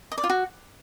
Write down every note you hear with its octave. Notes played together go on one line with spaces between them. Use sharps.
D#5
D5
F4
F#4